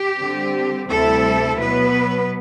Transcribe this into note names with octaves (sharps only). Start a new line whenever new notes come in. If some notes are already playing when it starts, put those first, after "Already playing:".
Already playing: G4
D3 G3 C4
D2 C3 G3 C4 E4 A4
B2 F#3 B3 B4